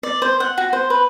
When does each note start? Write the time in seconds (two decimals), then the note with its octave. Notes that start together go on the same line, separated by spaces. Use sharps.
0.03 D5
0.22 C5
0.40 F#5
0.58 F#4
0.73 C5
0.90 B4